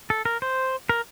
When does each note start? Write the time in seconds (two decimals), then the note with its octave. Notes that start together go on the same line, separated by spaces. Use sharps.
0.10 A4
0.25 A#4
0.42 C5
0.89 A#4